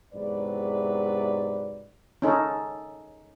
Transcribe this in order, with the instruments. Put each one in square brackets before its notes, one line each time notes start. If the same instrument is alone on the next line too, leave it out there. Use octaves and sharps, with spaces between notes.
[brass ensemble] E2 G#2 C3 F#3 B4 D5
[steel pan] C#4 D#4 A4